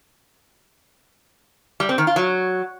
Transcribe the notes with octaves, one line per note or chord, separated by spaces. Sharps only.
G3
C4
D#3
F4
F#3